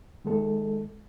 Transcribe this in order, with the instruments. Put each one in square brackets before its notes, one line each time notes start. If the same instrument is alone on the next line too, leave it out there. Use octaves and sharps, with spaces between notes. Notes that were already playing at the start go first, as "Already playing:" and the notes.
[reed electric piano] D#3 G#3 A4